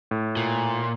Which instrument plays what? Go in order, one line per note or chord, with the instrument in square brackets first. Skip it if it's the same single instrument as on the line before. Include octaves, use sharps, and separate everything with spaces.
[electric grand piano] A2
[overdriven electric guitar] A#2